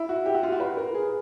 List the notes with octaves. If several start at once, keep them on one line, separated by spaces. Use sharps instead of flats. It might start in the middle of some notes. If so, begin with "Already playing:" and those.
Already playing: E4
F#4
G4
F#4
F4
F#4
B4
A#4
G#4